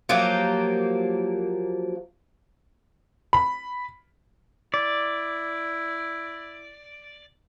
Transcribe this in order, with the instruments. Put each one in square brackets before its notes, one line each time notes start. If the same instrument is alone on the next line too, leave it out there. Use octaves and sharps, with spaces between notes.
[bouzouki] F3 F#3 A#3 G4
[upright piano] B5
[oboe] E4 [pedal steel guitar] D5